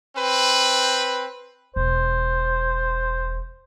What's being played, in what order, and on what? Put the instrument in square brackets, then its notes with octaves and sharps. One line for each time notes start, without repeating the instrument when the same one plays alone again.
[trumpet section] C4 B4
[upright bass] E1 [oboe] C5